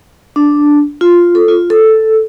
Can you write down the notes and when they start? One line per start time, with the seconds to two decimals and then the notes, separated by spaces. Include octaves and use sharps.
0.36 D4
1.01 F4
1.35 A4
1.48 F4
1.70 A4